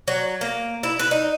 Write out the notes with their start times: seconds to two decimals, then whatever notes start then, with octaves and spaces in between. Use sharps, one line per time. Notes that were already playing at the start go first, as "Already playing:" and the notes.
0.08 F#3
0.41 A#3
0.83 E4
0.99 B4
1.11 D#4